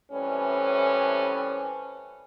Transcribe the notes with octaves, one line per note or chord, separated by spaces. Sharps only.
A2 E3 G3 C4 C#4 B4